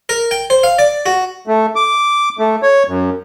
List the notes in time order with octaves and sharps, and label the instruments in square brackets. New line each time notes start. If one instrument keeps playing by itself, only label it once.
[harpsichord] A#4
G5
C5
F5
D5
F#4
[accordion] A3
D6
A3
C#5
F#2